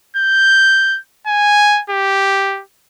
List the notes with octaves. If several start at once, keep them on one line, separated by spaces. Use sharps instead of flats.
G6
G#5
G4